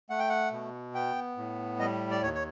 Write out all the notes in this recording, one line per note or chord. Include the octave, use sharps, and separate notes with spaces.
A3 F#5
G5
F#5
B2
B3 G5
A2
G3 D#5
D5
D#2 C#5
C#5